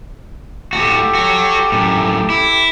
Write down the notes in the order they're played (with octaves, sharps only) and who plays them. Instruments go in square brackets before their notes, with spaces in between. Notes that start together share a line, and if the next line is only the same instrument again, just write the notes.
[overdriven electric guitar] A2 F#4 [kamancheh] G4 A4
[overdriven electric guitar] F#4 C#5
F#2 A2
E4